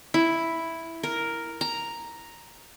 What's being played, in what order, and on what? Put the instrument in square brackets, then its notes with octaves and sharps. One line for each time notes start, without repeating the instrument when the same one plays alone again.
[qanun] E4
A#4
A#5